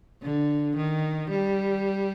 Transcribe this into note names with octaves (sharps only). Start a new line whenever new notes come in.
D3
D#3
G3